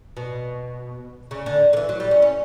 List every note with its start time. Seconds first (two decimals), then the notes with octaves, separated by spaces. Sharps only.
0.17 B2
1.31 C#3
1.46 D3
1.73 D3
1.77 E3
1.89 F#3
2.00 G3
2.11 C#4
2.22 C#4